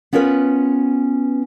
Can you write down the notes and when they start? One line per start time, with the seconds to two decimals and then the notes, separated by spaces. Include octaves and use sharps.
0.13 B3 C#4 F4 A#4 B4